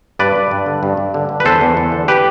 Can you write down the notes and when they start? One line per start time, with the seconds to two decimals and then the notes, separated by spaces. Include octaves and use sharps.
0.19 G2 B4 D5
0.36 G2
0.51 G2
0.66 D3
0.83 G2
0.97 G2
1.14 D3
1.29 D3
1.40 B4
1.45 E2 A4 C5
1.61 E2
1.77 E2
1.92 D3
2.08 G4 B4